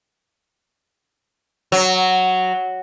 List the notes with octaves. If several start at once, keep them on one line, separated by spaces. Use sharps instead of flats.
F#3